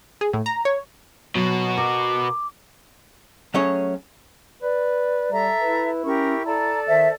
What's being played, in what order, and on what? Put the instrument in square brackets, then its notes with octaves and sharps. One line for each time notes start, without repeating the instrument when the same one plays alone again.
[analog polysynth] G#4
A2
A#5
C#5
[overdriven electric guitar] B2 F#4 [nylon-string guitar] F#3
[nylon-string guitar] A#4 [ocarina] D6
[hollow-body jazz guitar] F#3 A3 C#4 G#4 C#5
[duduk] B4 [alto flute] D5
[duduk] G3 [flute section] A4 E5 A#5
[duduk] E4 [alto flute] B4
[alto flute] C#4 [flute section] G4 A#4 C#6
[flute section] A4 D5 A5 [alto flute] A#5
[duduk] D#3 [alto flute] C5 [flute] E5